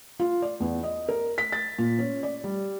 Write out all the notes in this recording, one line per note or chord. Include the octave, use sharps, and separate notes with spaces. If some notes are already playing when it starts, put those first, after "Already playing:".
F4
D5
E2
D#5
A#4
B6
A6
A#2
C#4
D5
G3